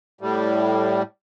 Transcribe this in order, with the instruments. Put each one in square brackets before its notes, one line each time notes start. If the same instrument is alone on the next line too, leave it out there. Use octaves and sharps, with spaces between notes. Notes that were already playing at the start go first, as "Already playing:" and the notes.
[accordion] A2 G3